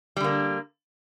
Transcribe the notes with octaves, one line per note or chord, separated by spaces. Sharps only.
D3 G3 A#3